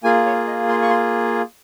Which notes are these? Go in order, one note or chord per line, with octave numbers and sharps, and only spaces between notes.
A#3 F4 G#4 G#5
C#5
D#5
C6
C#6
C6